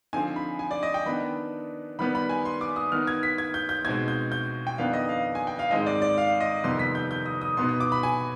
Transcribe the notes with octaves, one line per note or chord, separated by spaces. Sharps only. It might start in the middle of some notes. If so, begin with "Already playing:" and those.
D3 F3 C4 D#4 G#5
B5
G#5
D5
D#5
G5
D#3 B3 D4 B5
D#3 G3 B3 B5
B5
G#5
C6
D6
D#6
D#3 B3 D#4 F6
G#6
B6
G#6
G6
G6
B2 G#3 C4 D#4 G#6
G6
G6
G5
F2 D#3 B3 D4 F5
D#5
F5
G#5
G5
F5
G#2 D#3 G#3 C4 D#5
D5
D5
F5
D#5
F2 C3 D#3 G3 B3 C6
B6
G6
G6
D#6
D#6
B2 B3 D#4 C6
D#6
D6
B5
G#5